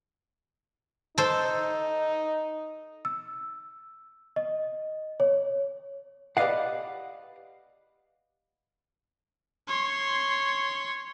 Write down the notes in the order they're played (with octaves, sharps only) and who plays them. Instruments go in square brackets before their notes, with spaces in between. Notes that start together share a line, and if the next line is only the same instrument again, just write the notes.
[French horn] D#4 [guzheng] A4 C5
[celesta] E6
D#5
C#5
[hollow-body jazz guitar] G4 B4 D5 D#5 F5 F#5
[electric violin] C#5 C6